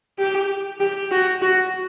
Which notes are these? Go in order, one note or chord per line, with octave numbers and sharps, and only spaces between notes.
G4
G4
F#4
F#4